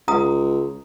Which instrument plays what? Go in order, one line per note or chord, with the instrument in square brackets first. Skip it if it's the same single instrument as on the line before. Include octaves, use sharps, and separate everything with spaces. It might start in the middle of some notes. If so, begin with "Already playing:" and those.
[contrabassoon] C#2 [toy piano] A#5 D#6